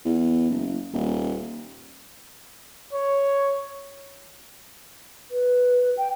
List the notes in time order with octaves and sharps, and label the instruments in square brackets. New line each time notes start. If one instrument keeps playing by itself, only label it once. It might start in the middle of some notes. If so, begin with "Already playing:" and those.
[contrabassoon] E2
F#1
D#1
[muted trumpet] C#5
[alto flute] B4
G5